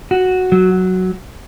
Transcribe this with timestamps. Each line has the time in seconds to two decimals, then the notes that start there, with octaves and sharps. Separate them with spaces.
0.11 F#4
0.52 F#3